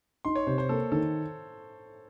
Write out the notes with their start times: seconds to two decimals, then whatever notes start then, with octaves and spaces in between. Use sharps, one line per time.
0.25 D#4 C6
0.36 C#5
0.47 C3 C5
0.58 C5
0.69 A#3 A4
0.92 D#3 A4